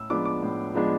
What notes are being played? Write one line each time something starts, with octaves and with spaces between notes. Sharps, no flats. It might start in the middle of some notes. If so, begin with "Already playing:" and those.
Already playing: A2 E6
F3 G#3 B3 D4 D6
D6
A2
F3 G#3 B3 D4